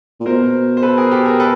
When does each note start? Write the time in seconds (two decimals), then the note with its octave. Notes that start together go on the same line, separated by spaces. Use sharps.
0.20 A#2
0.26 B2 A#4 C5
0.77 C5
0.83 A4 B4
0.97 G#4 A#4
1.11 G4 A4
1.25 G#4 A#4
1.40 A4 B4